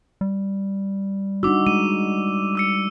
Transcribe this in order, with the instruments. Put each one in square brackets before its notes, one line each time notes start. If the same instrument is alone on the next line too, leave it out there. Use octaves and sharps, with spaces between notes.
[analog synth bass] G3
[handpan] D4 D#4 F#4 [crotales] D6 E6
[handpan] G#3 [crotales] D#7
[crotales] D6 E6 C#7